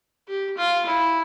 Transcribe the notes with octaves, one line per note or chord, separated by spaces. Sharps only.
G4
F4
E4